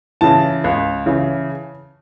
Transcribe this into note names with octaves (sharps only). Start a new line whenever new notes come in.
C#3 E3 A5
C#2
C#3 E3